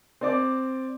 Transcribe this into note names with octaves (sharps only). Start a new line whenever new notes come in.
C4 D5 D6